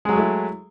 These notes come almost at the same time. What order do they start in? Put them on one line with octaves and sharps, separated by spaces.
G#3 F#3 G#4 A3 E4